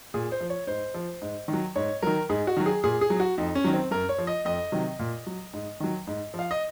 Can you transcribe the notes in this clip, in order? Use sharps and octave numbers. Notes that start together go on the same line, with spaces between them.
A#2 G#4
C5
F3
C#5
G#2 C5
F3
G#2
D#3
F#3
G#2 C#5
D#3 F#3 A#4
G#2 G#4
F#4
D#3 F#3
G#4
A#2 G#4
G#4
F#3
F#4
F2 D#4
C#4
D#3 F#3
C4
F#2 A#4
C#5
F3
D#5
F2 D#5
C3 D#3 F#3
A#2
F#3
G#2
D#3 F#3
G#2
F3
F5
D#5